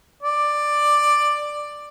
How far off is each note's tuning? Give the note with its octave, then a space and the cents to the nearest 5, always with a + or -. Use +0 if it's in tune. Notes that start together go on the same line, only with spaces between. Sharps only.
D5 +10